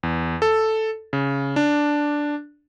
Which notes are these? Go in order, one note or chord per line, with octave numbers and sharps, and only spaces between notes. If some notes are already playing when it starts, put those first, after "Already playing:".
E2
A4
C#3
D4